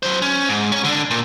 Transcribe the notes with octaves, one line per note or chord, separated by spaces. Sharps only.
F#3 C5
C#4
G#2
C#4 C#5
D3 D4
A#2